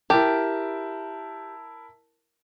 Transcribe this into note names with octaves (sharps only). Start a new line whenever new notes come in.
E4 G4 A#4 A5